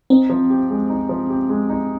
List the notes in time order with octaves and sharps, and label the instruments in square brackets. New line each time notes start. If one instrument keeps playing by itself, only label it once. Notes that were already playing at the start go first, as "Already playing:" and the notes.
[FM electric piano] C4 [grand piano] D#4
[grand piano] F3
G4
G#3
D#4
F3
G4
G#3
D#4